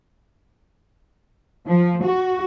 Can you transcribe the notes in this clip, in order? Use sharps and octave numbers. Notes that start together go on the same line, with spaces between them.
F3
F#4